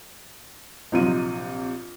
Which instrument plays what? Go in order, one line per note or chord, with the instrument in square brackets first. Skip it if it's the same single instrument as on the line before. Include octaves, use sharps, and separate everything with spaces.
[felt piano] A#1 C3 D#7 [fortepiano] F3 F#3 D#4